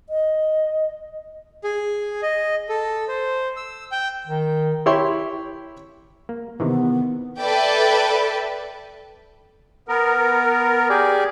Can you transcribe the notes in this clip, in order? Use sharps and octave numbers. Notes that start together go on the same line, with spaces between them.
D#5
G#4
D#5
A4
C5
E6
G5
D#3
E4 G4 C#5 C6
A#3
C3 D#3 E3 B3
A4 B4 D5 E5 G5
B3 A#4
G4 G#4 D5